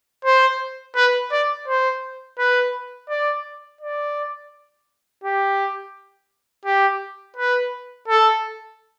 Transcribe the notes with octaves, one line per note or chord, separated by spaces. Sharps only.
C5
B4
D5
C5
B4
D5
D5
G4
G4
B4
A4